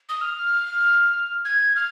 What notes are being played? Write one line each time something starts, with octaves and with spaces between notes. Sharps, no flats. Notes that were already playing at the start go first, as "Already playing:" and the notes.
D#6
F6
G#6
F6